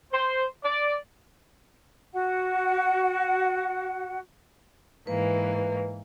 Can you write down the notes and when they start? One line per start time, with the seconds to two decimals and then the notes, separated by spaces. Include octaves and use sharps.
0.13 C5
0.63 D5
2.12 F#4 F#5
5.07 G#2 E3 A#3 B4